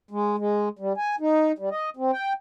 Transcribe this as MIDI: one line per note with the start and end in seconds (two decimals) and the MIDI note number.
0.11 0.36 56
0.38 0.69 56
0.79 0.93 55
0.97 1.16 80
1.20 1.52 63
1.59 1.69 55
1.71 1.90 75
1.97 2.11 60
2.13 2.33 79